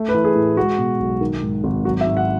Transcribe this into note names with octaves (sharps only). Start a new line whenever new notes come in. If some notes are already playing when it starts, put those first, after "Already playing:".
Already playing: A3
B4
E3
G#4
A2
G#3 F#4
B2
B1
D#3
G#2
G#1
F#3 F#4
E5
G#2
F#5